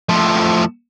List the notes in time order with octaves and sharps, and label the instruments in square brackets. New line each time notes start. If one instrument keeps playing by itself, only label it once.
[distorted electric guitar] A2 F3